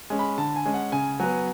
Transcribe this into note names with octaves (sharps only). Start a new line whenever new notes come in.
G#3 C#4
B5
D3 A5
G#5
G#3 C#4
F#5
C#3 G#5
F#3 B3 G#5